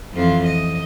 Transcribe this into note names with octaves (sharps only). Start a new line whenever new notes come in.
F2 E3 F4
D#5